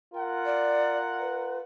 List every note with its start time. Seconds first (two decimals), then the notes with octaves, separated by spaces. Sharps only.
0.14 F4 A#4 F#5
0.46 D5
1.20 B4